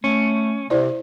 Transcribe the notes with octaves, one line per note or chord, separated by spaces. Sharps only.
A3 C#4
C3 E4 C5 D5